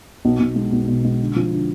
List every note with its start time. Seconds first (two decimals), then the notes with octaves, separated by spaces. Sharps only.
0.25 B1
0.40 B1
0.56 G#3
0.72 B1
0.88 B2
1.05 G#3
1.20 D3
1.36 F3
1.52 D3